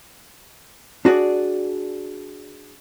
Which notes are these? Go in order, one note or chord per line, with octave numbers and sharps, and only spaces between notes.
D4 F#4 G#4 D5